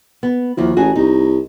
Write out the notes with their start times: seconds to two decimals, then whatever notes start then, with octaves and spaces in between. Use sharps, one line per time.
0.23 B3
0.57 D#2 F3 E4 F#4
0.77 A1 F#4 G#4
0.96 C2 D#4